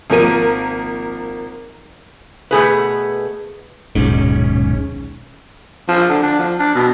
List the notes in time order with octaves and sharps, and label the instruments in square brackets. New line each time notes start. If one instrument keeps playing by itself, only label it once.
[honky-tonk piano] G#1 F3 A#3 A#4 D#7
[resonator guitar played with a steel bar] B2 A3 G#4 B4
[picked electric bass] D#1 B1 G#2 [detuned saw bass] C#4
[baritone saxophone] F3
D3
D4
F3
D4
B2